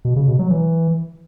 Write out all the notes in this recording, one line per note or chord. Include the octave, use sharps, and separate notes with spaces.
B2
C#3
B2
F#3
E3